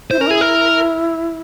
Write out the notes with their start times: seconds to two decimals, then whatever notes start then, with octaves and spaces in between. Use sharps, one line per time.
0.11 E4 C5
0.19 C#4 A#4
0.27 E4 G#4
0.41 A#4